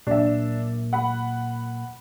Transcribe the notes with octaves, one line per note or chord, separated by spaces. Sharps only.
A#2 F#3 D4 E5
F#5 B5